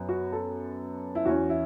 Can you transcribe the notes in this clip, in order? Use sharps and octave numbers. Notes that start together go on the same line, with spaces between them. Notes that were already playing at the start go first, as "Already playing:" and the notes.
Already playing: F#2 B3
F#4
A4
E4
E2 E3 C#4 F#4
E4